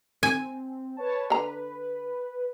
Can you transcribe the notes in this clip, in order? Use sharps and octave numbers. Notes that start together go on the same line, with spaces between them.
C4 G#5
B4 C#5 A5
D3 B4 A#5